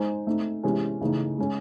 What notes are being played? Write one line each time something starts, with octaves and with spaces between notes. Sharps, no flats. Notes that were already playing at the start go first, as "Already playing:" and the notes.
Already playing: G#3 D#4 G#4 C5
A3 C4 D#4
C3 E3 G#3 C#4
C#3 E3 A3 D#4
G#3 C#4 G#4